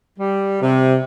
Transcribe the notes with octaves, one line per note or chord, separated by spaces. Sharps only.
G3
C3